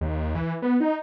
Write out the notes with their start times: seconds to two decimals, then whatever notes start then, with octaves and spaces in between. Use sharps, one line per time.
0.01 D#2
0.35 E3
0.62 B3
0.80 D#4